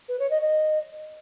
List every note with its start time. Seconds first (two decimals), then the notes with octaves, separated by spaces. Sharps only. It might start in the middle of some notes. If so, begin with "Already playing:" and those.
0.08 B4
0.19 C#5
0.30 D#5
0.41 D#5